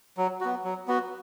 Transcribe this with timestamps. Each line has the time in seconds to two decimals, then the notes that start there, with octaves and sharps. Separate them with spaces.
0.17 F#3
0.41 B3 F#4
0.64 F#3
0.88 B3 F#4